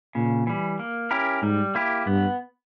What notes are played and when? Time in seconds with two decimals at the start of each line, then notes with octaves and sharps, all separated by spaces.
0.15 A#2 C#3
0.47 E3 G3
0.79 A#3
1.11 C#4 E4 G4 A#4
1.42 G#2 G3
1.75 A#3 E4 G4
2.07 G2 B3